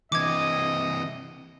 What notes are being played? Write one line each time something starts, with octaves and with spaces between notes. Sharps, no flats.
C3 E3 D#5 D6 G#6